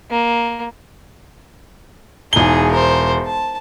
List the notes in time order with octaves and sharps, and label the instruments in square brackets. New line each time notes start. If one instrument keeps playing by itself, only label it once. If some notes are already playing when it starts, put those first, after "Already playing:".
[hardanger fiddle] A#3
[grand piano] E1 G7 [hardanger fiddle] D#4 G#4
[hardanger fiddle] A#4 C5
A5